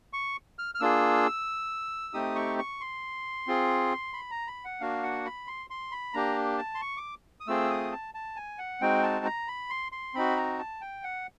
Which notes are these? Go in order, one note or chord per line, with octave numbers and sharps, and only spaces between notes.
C#6
F6
F6
A#3 D4 F4 G#4 E6
A3 C4 D#4 G4 D#6
C#6
C#6
C6
C4 F4 G#4
B5
A#5
B5
F#5
A#3 D4 F#4 F5
F#5
B5
C6
C6
B5
A#3 D4 G4 A#5
A5
C6
C#6
D6
D#6
A3 C4 F4 G#4 E6
D#6
A5
A5
G#5
F#5
G#3 C4 D#4 F#4 G5
A5
A#5
B5
C6
C6
C4 D#4 F#4 B5
A#5
A5
G5
F#5